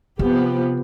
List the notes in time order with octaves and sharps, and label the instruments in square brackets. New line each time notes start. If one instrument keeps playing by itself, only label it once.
[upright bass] C3 [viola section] F3 B3 G4